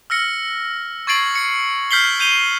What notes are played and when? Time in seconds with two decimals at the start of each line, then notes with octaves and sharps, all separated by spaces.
0.10 E6 F6 A#6 C#7
1.07 C#6 G#6 A6 C7 D7 F#7
1.35 C#7
1.91 F6 G6 B6 C7 F#7 G7
2.20 G6 D#7 F7 G7